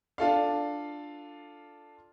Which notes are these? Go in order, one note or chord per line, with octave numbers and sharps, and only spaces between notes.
D4 F4 A4 F5